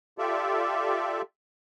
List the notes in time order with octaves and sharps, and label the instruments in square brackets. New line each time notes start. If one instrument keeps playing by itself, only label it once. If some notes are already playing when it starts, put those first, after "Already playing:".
[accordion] F4 G4 A4 D5 E5